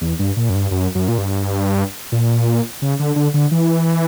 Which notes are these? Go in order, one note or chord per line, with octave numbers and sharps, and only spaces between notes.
E2
G2
A#2
F#2
G2
F#2
F#2
A#2
G2
A#2
C#3
D3
D3
D3
E3